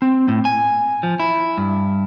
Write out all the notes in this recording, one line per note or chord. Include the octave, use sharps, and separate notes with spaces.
C4
A2
G#5
F3
E4
G2